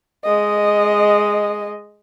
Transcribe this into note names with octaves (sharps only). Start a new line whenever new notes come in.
G#3 D#5